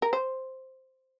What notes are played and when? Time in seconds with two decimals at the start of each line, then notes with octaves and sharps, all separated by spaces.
0.02 A#4
0.13 C5